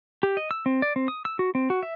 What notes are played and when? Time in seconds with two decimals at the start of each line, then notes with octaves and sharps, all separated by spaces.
0.23 G4
0.37 D#5
0.51 E6
0.66 C4
0.82 D5
0.96 C4
1.08 D#6
1.25 E6
1.39 F#4
1.55 C4
1.70 F#4
1.83 E5